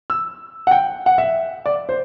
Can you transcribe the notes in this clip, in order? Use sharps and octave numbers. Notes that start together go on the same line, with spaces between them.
E6
F#5
G5
F#5
E5
D5
C5